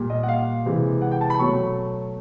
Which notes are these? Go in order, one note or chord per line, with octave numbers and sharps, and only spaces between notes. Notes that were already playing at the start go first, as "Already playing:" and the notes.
Already playing: A#2 G3
D#5
F#5
F5
C3 E3 G#3
F#5
G5
A5
B5
B2 F#3 A3 C#6